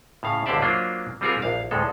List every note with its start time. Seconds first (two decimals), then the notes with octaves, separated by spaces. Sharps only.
0.23 A2 C#3 F5
0.46 C#2 D3 G4 C5 D5 E5
0.62 F#3 A#3 D4 F4 C5
1.21 G3 C4 F4 F#4 G#4 A#4
1.42 A#1 F5
1.71 D2 A2 G#3 A4